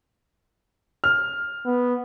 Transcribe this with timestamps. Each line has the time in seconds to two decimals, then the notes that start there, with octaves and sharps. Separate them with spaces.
1.04 F6
1.66 B3